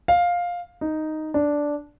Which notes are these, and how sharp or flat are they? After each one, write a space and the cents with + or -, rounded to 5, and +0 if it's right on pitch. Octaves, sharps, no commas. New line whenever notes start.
F5 +10
D#4 +0
D4 -5